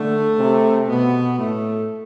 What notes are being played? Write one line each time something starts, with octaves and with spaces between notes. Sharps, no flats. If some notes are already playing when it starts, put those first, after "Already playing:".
Already playing: D3 A3
C3
B2 B3
A2 A3